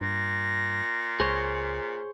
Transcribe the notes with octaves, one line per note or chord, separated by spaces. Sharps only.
G2 A#2 A#6
C#2 G#4 C5 C#5